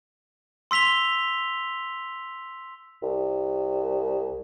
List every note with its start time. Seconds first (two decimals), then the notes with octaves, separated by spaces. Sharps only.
0.71 C6 E6 B6 F7 G7
3.02 C2